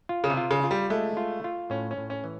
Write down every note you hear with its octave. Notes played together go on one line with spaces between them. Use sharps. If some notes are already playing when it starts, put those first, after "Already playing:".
F4
C#3
C3
F4
C#3
F4
G3
G#3 A3
F4
F4
A2 C#4
C#4
A2
C#4
E3